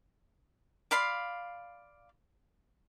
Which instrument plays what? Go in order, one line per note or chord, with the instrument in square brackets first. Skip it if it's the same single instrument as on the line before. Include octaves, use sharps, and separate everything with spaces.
[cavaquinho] D5 F5 B5 C6